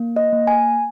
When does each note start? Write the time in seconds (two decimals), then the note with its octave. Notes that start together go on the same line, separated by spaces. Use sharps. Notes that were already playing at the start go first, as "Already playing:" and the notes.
Already playing: A#3
0.16 D#5
0.32 A#3
0.47 G#5